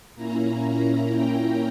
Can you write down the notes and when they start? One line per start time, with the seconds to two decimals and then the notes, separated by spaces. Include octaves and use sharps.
0.16 A#2 A#3 C#4 E4 A#5
1.12 G5